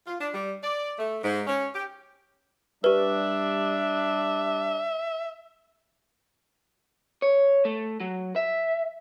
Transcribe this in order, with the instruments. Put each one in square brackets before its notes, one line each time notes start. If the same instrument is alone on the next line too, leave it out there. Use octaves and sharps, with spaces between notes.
[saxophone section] F4
D4
G3
D5
A3
G#2
C#4
G4
[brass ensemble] G3 D4 [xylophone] G4 B4 [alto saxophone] E5
[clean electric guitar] C#5
A3
F#3
E5